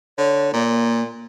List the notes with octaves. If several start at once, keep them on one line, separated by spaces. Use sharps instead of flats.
D3 C#5
A#2 A#3